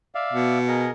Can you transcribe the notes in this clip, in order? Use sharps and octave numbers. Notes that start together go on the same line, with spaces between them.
D5 E5 F5
B2
G#4 A#4 D#5